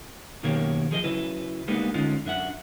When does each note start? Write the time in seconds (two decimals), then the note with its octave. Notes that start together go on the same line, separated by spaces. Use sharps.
0.43 F#2 B2 D#3 A#3 G4 C#5
0.91 F3 G#4 C5 D#5
1.04 C#3 F#3 E4 B4
1.68 G3 G#3 A#3 B3 D4 D#4
1.94 D3 G#3 C#4 D#4 F4
2.25 F#2 D4 E5 F#5